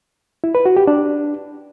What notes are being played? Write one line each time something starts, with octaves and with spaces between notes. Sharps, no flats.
E4
B4
F#4
G4
D4